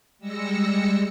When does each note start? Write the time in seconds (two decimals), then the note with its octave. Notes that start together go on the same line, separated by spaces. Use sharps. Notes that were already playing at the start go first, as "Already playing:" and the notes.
0.19 G3 G#3 E6 A#6 C#7